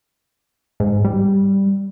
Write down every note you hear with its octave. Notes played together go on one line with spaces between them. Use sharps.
G#2
G3